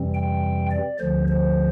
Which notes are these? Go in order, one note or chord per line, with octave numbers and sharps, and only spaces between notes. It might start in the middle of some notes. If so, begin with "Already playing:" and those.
Already playing: F2 C3 E3 G3 C4
G5
D5
D2 D3 F3 C5
C5